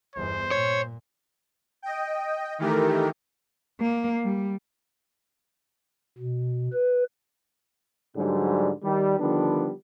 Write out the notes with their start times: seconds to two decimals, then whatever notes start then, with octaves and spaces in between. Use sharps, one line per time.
0.16 G1 E2 C5
0.51 A#2 C#5
1.82 D#5 G5
2.58 D#3 E3 A3 G4 A#4
3.80 A#3
4.24 G3
6.18 B2
6.73 B4
8.17 G#2 D3 F#3 G3
8.83 D#3 G3
9.20 D3 D#3 F3 G3 B3 D4